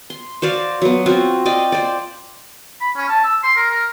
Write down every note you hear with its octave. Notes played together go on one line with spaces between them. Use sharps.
C6
F#4 C5 D5 F5
F#3 B3
C4 F4 F#4
D5 D#5 F5 G5
C5 D5
B5
C#4
A5
E6
C6
A#4
A#4